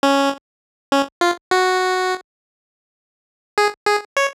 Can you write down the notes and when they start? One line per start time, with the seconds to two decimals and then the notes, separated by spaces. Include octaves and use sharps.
0.03 C#4
0.92 C#4
1.21 F4
1.51 F#4
3.58 G#4
3.87 G#4
4.17 C#5